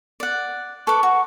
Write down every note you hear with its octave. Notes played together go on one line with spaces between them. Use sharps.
D5 F#5
A4 B4 C#6 D6
F#4